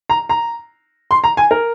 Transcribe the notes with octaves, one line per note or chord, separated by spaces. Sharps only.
A#5
A#5
C6
A#5
G#5
A#4